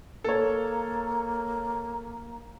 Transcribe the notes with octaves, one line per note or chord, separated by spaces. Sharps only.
A#3 A4 C#5